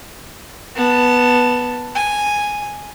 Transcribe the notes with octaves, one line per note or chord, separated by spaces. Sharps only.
B3 A5
G#5